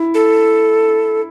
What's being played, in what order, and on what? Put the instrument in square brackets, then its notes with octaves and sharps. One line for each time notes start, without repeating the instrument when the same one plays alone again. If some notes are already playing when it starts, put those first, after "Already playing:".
Already playing: [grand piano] E4
[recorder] A4